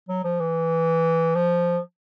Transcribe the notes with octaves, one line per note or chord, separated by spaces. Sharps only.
F#3
F3
E3
F3